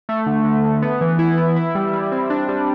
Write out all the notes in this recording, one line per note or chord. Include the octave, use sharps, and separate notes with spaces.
A3
D3
D3
D3
B3
E3
E4
B3
E4
G3
G3
C4
D4
G3